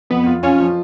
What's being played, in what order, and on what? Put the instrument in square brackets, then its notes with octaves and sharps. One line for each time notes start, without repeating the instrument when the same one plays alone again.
[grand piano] F2 [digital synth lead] B3
[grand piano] F4
[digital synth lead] C#4 [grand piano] F4
[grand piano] F3